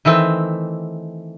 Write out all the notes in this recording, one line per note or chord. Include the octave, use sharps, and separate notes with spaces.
D#3 E3 A3 C4